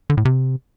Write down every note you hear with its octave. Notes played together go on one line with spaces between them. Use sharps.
D3
A2
C3